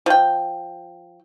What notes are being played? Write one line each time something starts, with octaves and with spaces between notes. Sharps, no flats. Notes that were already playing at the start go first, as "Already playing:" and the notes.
F3 G5